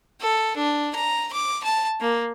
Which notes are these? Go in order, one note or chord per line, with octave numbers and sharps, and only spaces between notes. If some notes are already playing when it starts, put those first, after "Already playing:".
A4
D4
A#5
D6
A5
A#3